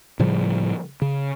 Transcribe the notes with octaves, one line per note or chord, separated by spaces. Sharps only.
A2 C#3 F3 G3
C#3